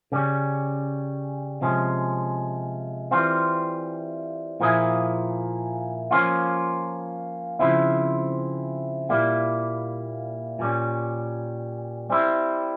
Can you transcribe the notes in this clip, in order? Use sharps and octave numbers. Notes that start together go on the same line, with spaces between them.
C#3 G3 C#4
C3 F3 G#3 C#4
E3 G3 C4 F4
A#2 F3 A#3 E4 G#4
F3 A#3 C#4 F4
C#3 F3 C4 E4
A#2 G3 A#3 E4
A#2 G3 C#4
G3 C4 E4